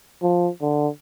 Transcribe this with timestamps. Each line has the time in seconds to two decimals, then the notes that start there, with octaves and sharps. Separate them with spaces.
0.22 F3
0.61 D3